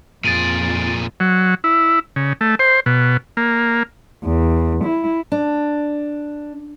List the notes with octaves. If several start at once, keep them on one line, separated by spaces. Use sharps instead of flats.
F2 A#2 F4 G#4 A6 D7 D#7
F#3
E4
C#3
A3
C5
B2
A#3
E2
E4
D4